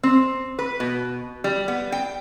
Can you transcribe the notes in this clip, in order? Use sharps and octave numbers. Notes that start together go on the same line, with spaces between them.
C4
B4
B2
G3
B3
G5